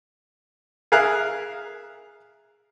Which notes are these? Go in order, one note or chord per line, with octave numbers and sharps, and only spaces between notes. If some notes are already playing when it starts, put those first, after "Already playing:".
G#4 A#4 E5 F5 F#6